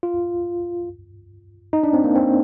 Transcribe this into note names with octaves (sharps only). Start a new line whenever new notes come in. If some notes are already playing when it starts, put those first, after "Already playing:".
F4
D#4
D4
C4
A#3
C4